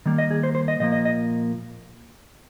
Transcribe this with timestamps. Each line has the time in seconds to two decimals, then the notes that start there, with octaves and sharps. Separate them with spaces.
0.06 D#3 G3 A#3
0.18 D#5
0.30 G#4
0.43 C5
0.55 C5
0.68 D#5
0.80 A#2 F3 A#3 D#5
0.92 D#5
1.05 D#5